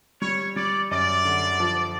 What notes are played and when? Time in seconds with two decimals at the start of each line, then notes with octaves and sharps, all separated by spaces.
0.22 G3 C#5
0.56 G3 D5
0.91 F#2 D5
1.25 D3
1.60 F3